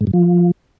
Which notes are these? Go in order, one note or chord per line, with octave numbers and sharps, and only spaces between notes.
G#2
G2
F3